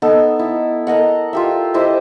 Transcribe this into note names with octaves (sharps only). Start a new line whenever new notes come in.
B3 D#4 A4
E4
A4 A#4 D#5 F#5
F4 G4 E5
E4 G4 C5 D#5